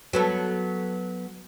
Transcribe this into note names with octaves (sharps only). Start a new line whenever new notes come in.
F#3 B3 A4